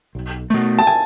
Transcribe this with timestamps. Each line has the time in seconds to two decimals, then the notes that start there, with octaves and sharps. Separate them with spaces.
0.15 B1
0.50 B2 A3
0.79 A5
0.87 G#5